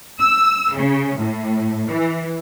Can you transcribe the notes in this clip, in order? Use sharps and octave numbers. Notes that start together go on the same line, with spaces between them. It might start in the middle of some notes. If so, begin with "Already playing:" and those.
E6
C#3
A2
E3